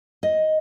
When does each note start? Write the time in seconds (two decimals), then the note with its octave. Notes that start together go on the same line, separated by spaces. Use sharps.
0.23 D#5